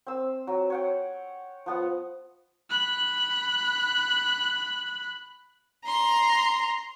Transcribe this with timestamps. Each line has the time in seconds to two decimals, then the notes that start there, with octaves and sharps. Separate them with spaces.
0.07 C4 E6
0.47 F#3
0.70 C#5 F#5 G5
1.66 F3 B3 F#5
2.70 B5 F#6
5.86 A#5 C6